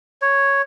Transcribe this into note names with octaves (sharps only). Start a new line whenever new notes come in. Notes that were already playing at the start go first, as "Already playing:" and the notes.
C#5